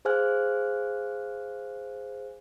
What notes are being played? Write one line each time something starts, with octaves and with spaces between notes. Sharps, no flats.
G#4 C5 F5 G#5 F6 F#6